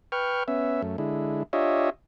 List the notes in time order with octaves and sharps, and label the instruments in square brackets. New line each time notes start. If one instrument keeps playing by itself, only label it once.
[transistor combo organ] B4 G5 C#6 F6
B3 C#4 E5
F#2 A3
D3 G#3 E4
D4 F4 G4 C#5 D#5 E5